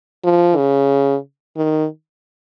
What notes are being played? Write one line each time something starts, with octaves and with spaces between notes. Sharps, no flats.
F3
C#3
D#3